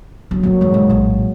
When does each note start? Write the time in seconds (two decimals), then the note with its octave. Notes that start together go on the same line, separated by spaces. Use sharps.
0.31 F#3 A#3 D4
0.43 F#3 G3 A#3 D4
0.61 G#2 E3 G#3
0.74 G#2
0.90 A#1 A2